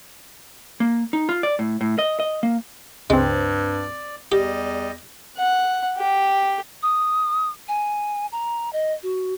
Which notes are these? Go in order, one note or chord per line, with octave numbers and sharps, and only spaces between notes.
A#3
D#4
F4
D5
A2
A2
D#5
D#5
A#3
C#2 G2 G#3 C4 D5
E2 G3 G4 D#5
F#5
G4
D#6
G#5
A#5
D#5
F#4